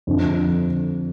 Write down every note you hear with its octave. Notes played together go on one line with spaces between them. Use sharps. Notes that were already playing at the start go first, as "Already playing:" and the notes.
F2 D3 F3